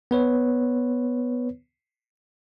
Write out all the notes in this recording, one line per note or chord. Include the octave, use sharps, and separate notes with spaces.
B3 B4 C#5